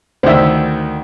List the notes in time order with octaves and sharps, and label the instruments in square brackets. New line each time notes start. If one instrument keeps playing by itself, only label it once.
[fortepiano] D2 D#3 [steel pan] C5 E5